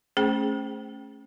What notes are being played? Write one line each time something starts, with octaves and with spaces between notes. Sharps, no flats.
A3 C#4 G#4 C5 G5